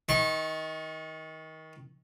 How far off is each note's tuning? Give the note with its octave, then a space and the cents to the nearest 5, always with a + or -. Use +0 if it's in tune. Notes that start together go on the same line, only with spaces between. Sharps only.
D#3 +25 C#6 -30